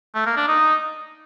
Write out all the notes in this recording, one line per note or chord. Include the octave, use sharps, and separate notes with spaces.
A3
A#3
D4
D#4